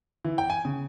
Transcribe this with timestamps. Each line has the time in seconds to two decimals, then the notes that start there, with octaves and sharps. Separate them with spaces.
0.25 E3
0.38 G5
0.50 G#5
0.65 C#3